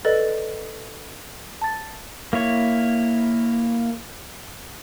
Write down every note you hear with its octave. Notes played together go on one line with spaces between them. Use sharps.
A4 B4 D5 D#5 A6
A5 A6
A#3 E4 C#5